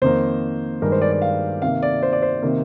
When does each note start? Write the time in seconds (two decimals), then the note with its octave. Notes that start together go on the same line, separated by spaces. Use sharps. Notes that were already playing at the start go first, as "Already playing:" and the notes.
0.02 F2 D#3 A#3 C5
0.82 G2 D#3 G#3 A#4
0.92 C5
1.02 D5
1.12 D5
1.22 F5
1.62 C3 D#3 A#3 F5
1.83 D5
2.03 C5
2.13 D5
2.22 C5
2.42 C3 D#3 A#3